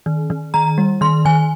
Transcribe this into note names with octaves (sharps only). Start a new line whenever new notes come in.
D#3
D#3
D#3 A#5
G3
D#3 C6
D#3 G#5